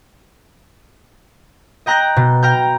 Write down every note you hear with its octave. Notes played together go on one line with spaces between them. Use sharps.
D#5 G5 A#5 F#6 G6 A#6
B2
G5 A#5 F6 G6